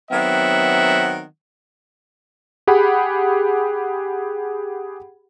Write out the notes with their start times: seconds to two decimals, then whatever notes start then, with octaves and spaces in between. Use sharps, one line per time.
0.11 D#3 F#3 B3 C4 E5 F#5
2.67 G4 G#4 F#5 B5